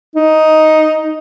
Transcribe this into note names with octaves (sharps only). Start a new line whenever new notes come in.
D#4